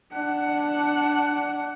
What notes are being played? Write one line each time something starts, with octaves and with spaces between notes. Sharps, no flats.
D4 F#5